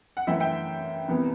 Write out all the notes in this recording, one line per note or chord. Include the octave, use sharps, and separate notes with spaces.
F#5
F#2 E3 A3 E5 G5
E5 G5
C2 C3 E3 B3